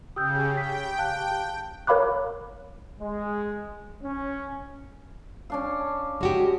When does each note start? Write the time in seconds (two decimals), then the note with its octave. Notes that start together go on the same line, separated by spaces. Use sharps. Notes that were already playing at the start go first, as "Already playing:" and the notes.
0.16 C#3 G4 D#6 E6 G6
0.57 G5 B6
0.98 F5 A5 F#6
1.87 A#4 C#5 F5 B5 D6 F#6
2.99 G#3
4.04 C#4
5.50 C#4 D4 F5
6.21 G#3 F#4 G4